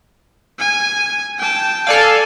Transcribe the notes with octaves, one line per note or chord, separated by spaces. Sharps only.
G#5
G5 A5
A4 D5 F5 G#5